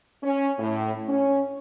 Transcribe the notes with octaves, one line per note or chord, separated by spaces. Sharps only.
C#4
A2
C#4